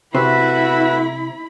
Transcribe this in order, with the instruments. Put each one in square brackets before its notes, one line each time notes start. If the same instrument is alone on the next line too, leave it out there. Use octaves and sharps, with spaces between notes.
[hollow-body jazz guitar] C3 C5 [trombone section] A3 F#4 [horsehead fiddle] E4 B5 [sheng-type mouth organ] B4 E5